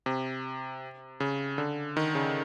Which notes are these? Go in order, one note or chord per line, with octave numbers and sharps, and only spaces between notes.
C3
C#3
D3
D#3
C#3